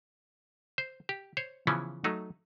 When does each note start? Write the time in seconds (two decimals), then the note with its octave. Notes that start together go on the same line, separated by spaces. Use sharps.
0.78 C5
1.09 G4
1.37 C5 C#5
1.67 C#3 E3 F3 B3 C#4
2.04 F#3 A3 D#4